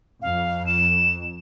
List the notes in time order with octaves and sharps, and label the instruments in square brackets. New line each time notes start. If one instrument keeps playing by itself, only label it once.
[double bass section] F2 [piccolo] F5
[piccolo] E7